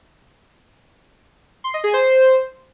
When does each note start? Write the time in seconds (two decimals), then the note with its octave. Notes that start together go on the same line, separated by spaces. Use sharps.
1.64 C6
1.74 D#5
1.84 G#4
1.94 C5